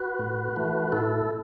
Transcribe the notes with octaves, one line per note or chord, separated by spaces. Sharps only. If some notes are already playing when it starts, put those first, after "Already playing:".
Already playing: F#4 B4
A2
E3 A3
A2 E4 A4